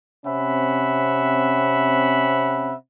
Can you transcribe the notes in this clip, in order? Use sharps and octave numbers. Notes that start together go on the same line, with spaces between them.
C3 C4 C#4 E5 F#5 B5